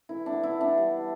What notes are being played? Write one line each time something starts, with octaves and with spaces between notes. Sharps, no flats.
E3 E4
D4
B3
E4
E3
D4
G3